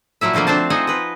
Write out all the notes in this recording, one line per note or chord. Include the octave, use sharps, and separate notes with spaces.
A#2 F3 F#3 E4 E5
B2 D3 F3 A3 A#3
C4 D4 C5 A5
F3 D#4 D#5 F#5 G#5
B4 D#5